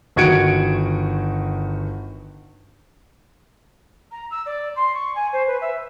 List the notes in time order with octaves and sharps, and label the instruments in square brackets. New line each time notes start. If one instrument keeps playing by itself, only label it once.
[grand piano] G1 D#3 F#4 G#6 C#7 D7
[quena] A#5
E6
D5
C6
C#6
G#5
C5
B4
E5